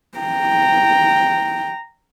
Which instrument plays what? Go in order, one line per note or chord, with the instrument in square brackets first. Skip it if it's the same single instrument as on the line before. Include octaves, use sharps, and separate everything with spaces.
[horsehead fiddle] G5 A#5